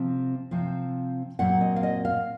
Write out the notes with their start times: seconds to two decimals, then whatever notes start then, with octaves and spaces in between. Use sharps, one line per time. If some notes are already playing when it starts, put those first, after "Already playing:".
Already playing: C3 F3 C4
0.51 C3 F3 C4
1.39 A#2 F#3 C4 F#5
1.61 D#5
1.76 F5
1.83 D#5
2.05 F5